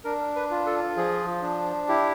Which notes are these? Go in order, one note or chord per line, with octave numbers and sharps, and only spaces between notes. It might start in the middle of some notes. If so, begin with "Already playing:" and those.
D4 A#4
B4
F4
A4
F3 G#4
D4
E4 G4